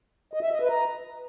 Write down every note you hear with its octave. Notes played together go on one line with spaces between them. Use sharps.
D#5
E5
D#5
B4
A#5